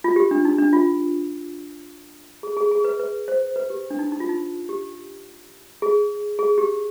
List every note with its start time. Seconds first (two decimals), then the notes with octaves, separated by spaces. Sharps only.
0.04 F4
0.16 G4
0.31 D4
0.45 D#4
0.58 D4
0.73 F4
2.43 G#4
2.57 G#4
2.71 G#4
2.84 B4
3.00 B4
3.28 C5
3.56 B4
3.70 G4
3.90 D4
3.99 D#4
4.12 D#4
4.20 F4
4.29 D#4
4.69 G4
5.82 G#4
6.39 G#4
6.58 G4